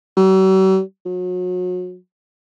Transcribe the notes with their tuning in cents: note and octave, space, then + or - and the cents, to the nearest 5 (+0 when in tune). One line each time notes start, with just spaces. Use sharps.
F#3 +45
F#3 -35